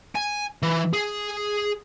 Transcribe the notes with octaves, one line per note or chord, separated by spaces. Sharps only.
G#5
E3
G#4